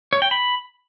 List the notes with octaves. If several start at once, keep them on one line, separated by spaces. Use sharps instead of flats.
C#5
G5
B5